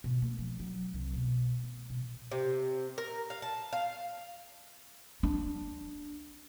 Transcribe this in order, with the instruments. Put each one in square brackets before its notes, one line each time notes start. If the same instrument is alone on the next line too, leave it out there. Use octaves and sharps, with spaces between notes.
[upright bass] B2
A#3
F3
F#3
C2
B2
B3
B2
[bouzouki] C3
A#4
F5
A5
F5
[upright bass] D4